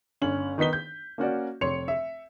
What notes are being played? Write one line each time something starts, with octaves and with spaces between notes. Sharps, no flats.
G1 C#4 F#7
D#3 B3 D#4 B6 G7
G6
A#3 C#4 F#4 D5
F1 C#5 C6 C#7 F7
E5